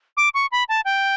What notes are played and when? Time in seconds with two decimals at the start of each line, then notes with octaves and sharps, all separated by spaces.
0.17 D6
0.34 C#6
0.52 B5
0.69 A5
0.85 G5